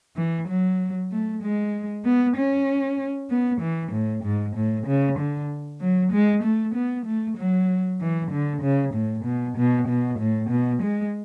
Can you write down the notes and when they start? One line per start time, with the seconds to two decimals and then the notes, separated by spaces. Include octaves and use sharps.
0.17 E3
0.48 F#3
1.12 A3
1.43 G#3
2.05 B3
2.37 C#4
3.30 B3
3.61 E3
3.92 A2
4.24 G#2
4.56 A2
4.87 C#3
5.18 D3
5.80 F#3
6.12 G#3
6.43 A3
6.75 B3
7.06 A3
7.37 F#3
8.01 E3
8.31 D3
8.62 C#3
8.94 A2
9.25 B2
9.57 B2
9.88 B2
10.19 A2
10.50 B2
10.82 G#3